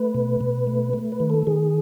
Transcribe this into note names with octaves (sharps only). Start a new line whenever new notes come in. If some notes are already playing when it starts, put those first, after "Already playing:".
Already playing: A3 B4
B2
B2
A3
A3
B4
D#3
A4
D#3 G#4